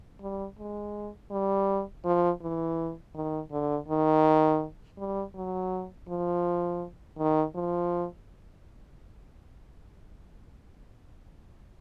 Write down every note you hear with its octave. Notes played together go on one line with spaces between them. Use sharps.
G3
G#3
G3
F3
E3
D#3
D3
D#3
G3
F#3
F3
D#3
F3